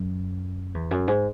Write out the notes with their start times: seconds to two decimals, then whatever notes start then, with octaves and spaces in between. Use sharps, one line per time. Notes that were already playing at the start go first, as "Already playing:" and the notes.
Already playing: F#2
0.75 E2
0.91 F#2
1.08 G#2